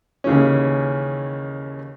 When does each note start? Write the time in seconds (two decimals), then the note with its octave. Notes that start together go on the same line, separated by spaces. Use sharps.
0.24 D#2 C#3 E3 C#4